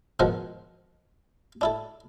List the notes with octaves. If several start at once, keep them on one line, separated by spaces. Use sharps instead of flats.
G#2 B2 D#3 F3 A#4 F#5
D4 E4 A4